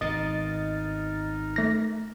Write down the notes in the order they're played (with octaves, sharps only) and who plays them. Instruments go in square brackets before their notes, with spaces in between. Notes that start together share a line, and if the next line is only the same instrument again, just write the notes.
[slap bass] G#1 B2 [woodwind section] D#4 A#4 [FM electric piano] D#5 A6
[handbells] A3 A#6